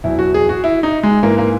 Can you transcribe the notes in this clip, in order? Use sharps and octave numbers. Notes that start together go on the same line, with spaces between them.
E2 B2 F#3 E4
F#4
G#4
F#4
E4
D#4
G#3
G#2 E3 A#3
A#3